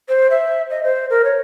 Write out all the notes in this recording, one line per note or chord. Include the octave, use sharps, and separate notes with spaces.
C5
E5
D#5
C5
A#4
C#5